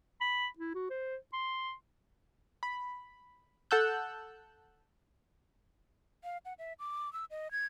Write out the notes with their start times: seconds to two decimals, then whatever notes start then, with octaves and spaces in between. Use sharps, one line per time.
0.21 B5
0.58 E4
0.74 F#4
0.90 C5
1.33 C6
2.63 B5
3.71 A4 F#5 A5 E6 F#6 G6
6.24 F5
6.45 F#5
6.59 E5
6.79 D6
7.13 E6
7.31 D#5
7.51 G#6